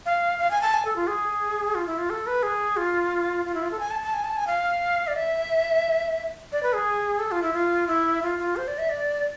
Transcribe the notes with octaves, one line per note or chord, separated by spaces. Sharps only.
F5
F5
G#5
A5
G#5
A4
F4
G#4
F4
E4
F4
A4
B4
G#4
F4
F4
E4
F4
A4
G#5
A5
A5
G#5
A5
G#5
F5
D5
E5
D5
B4
G#4
A4
F4
E4
F4
E4
F4
F4
C5
D5
E5
D5